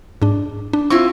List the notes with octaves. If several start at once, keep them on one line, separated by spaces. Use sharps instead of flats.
G#2 D4
D4
C4 E4 F4 C#6